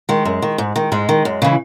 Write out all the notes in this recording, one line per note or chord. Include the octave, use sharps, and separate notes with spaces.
D#3 G#3
F#2
D#3
G#2
D#3
G#2 G#3
D#3
F#2
C#3 E3